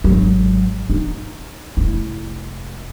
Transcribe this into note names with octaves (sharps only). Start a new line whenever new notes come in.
G#1 F#3
D#4
F1 E4